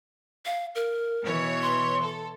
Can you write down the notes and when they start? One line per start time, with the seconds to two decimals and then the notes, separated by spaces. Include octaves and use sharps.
0.46 F5
0.75 A#4
1.23 B2 E3 C#5
1.62 C6
2.02 A4